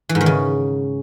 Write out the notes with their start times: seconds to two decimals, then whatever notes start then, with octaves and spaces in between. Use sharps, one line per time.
0.09 E3
0.15 G#2
0.21 D#3
0.26 C#3